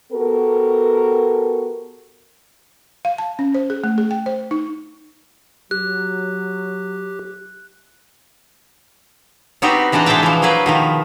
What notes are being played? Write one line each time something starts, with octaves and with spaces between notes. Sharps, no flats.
B3 F#4 G4 A4 A#4
F5
A5
C#4
C5
G#4
A3
G#4
G5
C5
D#4
F#3 G4 F#6
B3 C4 D#4 F#4 G4
E3 G#3 D4 D#4 D#5
B2 G#3 C5 E5 G5 A5
E3 F3
F#3 A#3 G#4 B4 C5
B2 D#3 F3